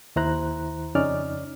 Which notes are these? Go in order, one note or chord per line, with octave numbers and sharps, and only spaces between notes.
D#2 D#3 E4 C5 A#5 F#6
F2 C#3 C#4 D#4 D5 F6